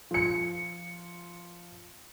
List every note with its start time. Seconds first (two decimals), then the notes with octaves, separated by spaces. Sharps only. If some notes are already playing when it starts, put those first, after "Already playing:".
0.11 F3 C#7